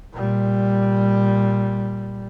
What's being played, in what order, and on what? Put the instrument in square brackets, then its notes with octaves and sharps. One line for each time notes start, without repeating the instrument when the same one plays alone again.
[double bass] A#2 G3